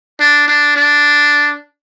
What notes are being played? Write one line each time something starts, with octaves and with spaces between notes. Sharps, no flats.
D4
D4
D4